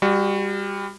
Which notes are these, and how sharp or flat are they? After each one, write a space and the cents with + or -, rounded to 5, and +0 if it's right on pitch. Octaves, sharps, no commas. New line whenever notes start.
G3 +25 F#4 +0